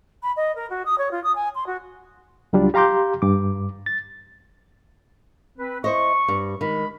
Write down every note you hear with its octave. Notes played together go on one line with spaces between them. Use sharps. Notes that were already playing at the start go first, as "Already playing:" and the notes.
B5
D#5
A#4
F#4
D#6
C#5
F4
D#6
G#5
C6
F#4
C#2 F#3 G3 D4 F4
G4 F5 A#5 C6 D6 G6
G2 D6
A6
C4 B4
E4 C5 D#5 C#6
G2
D#3 G#3 B5